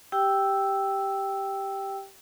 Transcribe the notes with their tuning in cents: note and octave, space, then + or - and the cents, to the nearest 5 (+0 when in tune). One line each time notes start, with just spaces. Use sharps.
G4 +0 G5 +0 E6 +0